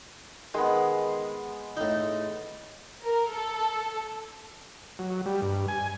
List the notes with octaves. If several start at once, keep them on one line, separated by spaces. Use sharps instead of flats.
D#3 G#3 B3
A2 D#4
A#4
A4
F#3
G3
G2
G#5